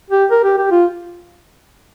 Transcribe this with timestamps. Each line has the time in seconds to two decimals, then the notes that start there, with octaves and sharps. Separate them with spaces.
0.11 G4
0.31 A#4
0.44 G4
0.58 G4
0.71 F4